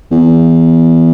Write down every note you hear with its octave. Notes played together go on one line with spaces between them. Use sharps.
E2